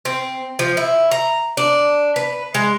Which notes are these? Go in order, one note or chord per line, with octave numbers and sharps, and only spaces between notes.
C4
F3
E4
A#5
D4
B4
G#3